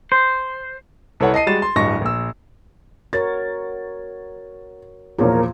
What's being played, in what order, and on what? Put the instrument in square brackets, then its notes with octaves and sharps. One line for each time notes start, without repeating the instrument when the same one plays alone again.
[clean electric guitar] C5
[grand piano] C2 A4 B4 C#5 F#5
D#5 A5 C7 D#7
G3 G#3 F#4 A6 E7
C6
D1 G2 D#5 C#6 A#6
A#1 E6
[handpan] F#4 A#4 C#5 [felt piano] A6
[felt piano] E2 A#2 F3 [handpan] F4 [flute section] A#4 C#5